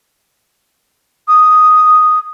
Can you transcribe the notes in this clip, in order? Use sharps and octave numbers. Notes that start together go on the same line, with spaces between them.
D#6